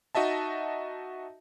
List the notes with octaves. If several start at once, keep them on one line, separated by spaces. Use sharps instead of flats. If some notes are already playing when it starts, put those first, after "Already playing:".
D#4 F#4 D#5 E5 A5